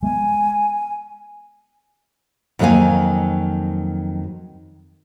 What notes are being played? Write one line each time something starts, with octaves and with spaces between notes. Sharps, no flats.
G#3 B3 G#5
F2 D#3 F#3 A#3 F5 G#5